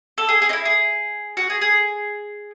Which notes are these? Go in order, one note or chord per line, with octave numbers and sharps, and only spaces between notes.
A4
G#4
G#4
D#4
E4
G#4
F#4
G#4
G#4